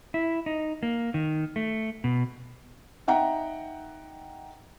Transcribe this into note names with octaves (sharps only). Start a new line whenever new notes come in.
E4
D#4
A#3
D#3
A3
B2
D#4 E5 F#5 G5 A#5